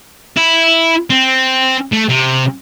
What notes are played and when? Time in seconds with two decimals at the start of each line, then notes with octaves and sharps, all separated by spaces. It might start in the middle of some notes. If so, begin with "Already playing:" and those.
0.37 E4
1.10 C4
1.92 A3
2.09 C3